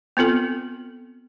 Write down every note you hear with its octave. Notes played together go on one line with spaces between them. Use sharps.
B3 C4 F4 A4